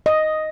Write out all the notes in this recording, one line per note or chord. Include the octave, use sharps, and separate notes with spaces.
D#5